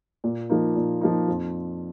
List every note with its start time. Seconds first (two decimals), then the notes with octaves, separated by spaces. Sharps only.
0.24 A#2
0.50 F3 A#3 D#4
0.76 A#2
1.01 F3 A#3 D#4
1.28 F2